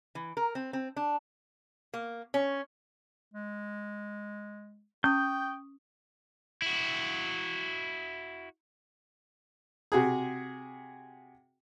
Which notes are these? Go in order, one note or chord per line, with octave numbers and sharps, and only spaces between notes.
E3
A#4
C4
C4
D4
A#3
C#4
G#3
C#4 G5 C#6 D#6 G6
E4 F#4
C3 F#4 G#4